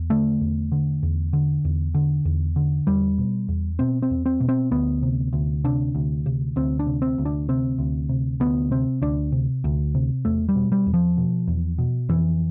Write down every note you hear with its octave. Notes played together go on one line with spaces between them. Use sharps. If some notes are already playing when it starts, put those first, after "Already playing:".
Already playing: E2
D3 A3
E2
D3
E2
D3
E2
D3
E2
D3
E2 G3
B2
E2
B2 C4
C4
E2
C4
B2
C4
D2 B3
C3
D2
C3 D4
D2
C3
D2 C4
D4
C3
C4
D2
D4
C3 C4
D2
C3
D2 B3
C3 C4
D2 D4
C3
D2
C3
E2 A3
G3
B2
G3
E2
F3
B2
E2
B2
F2 E3